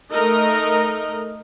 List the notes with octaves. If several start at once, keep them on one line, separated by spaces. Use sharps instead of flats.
A3 D#4 A#4 D#5